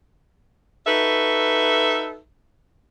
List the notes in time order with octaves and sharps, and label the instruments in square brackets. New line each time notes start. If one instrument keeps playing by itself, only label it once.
[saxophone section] D#4 F#4 A4 B4 E5